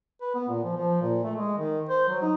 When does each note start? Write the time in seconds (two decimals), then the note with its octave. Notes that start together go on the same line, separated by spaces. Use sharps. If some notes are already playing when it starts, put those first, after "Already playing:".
0.22 B4
0.35 B3
0.49 A#2
0.64 F3
0.77 F3
1.01 A#2
1.23 A3
1.35 G#3
1.58 D#3
1.89 C5
2.08 F#3
2.22 D#4